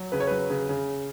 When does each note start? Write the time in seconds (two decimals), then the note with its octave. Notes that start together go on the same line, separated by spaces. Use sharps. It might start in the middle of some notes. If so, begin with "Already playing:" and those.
Already playing: F#3
0.12 C#3 B4
0.20 C#5
0.27 F#3 B4
0.50 C#3
0.69 C#3